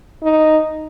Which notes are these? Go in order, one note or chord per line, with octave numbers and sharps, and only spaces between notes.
D#4